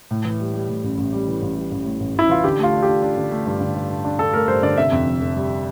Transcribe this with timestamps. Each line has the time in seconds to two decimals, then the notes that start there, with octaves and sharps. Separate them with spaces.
0.11 A2
0.25 E3
0.40 G3
0.54 G3
0.69 A2
0.84 A1
0.98 A1
1.13 G3
1.27 E3
1.42 A1
1.57 G3
1.71 A1
1.85 A2
2.00 A1
2.15 A1 E4
2.29 E3 F4
2.44 D3 G4
2.59 A3 F4
2.73 D4
2.83 G4
2.88 D4
3.02 D4
3.17 D3
3.32 A3
3.46 G2
3.61 D3
3.75 G2
3.90 D4
4.05 D4
4.19 D4 A4
4.33 A3 A#4
4.48 G2 C5
4.63 D3 D5
4.77 C3 E5
4.92 F2
5.07 F1
5.21 F1
5.35 G3